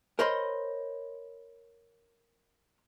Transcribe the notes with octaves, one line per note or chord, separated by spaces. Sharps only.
A#4 C5 C#5 D#5 B5 C6